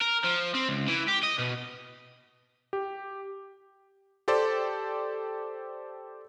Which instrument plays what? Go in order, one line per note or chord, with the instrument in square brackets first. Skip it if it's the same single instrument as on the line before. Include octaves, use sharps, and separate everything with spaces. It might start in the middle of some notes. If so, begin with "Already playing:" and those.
[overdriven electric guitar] A#4
F3
C4
C#2
E3
G4
D#5
B2
[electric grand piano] G4
G4 A4 C5 D5